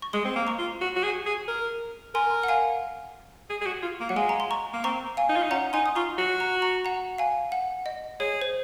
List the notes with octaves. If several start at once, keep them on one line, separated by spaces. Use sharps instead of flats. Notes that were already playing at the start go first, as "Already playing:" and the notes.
C#6
G#3 C6 D#6
C4
A#3
A#5 C#6
F4
F#4
F#4
G#4
G#4
A#4
A#4 G#5 C6
F#5
F5 G#5
G#4
G#4
F#4
F4
A#3
F#3 F#5
G#3 F5 G#5
A#5
C6
A#5 C#6
A#3
C4 A#5 C#6
F5 G#5
D#4
F4
D#4
C#4 F#5 A#5
D#4 G#5 C6
D#6
F4 A#5 C#6
F#4
A#5 C#6
A#5 C#6
F#5 A#5
F5 G#5
F#5
D#5
G#4 C#5
C5